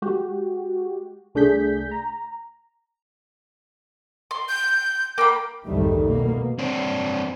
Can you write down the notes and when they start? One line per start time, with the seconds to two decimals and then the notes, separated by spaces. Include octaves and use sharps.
0.02 G#3 F#4 G4
1.35 C2 A3 D4 G#4 G6 B6
1.91 A#5
4.31 C6
4.49 G6
5.18 A#3 G5 B5
5.64 C2 F2 G#2 D#3 G3 A3
6.06 B2 A#3
6.59 C4 D4